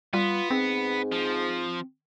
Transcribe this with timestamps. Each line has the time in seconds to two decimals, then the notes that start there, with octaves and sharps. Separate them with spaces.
0.14 G3 B3 F4
0.51 G#2 C4
1.12 F3